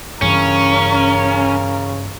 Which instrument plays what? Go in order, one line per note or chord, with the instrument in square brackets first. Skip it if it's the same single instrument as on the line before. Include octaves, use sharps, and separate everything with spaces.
[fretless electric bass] G2 E3 [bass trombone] C#3 [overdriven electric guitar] C#4 [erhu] A#4